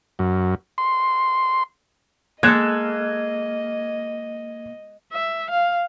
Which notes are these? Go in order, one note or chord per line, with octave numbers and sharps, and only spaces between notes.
F#2
C6
G#3 A#3 A4 D#5 F#6 G#6 E7
E5
F5